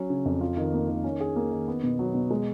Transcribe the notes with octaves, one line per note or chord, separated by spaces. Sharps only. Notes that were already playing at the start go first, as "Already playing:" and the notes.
Already playing: F#3 C#4
C#3
F2
F4
D#3
A#3
D#3
C#4
G#4
A#3
D#3
B3
B2
F#3
B2
G#3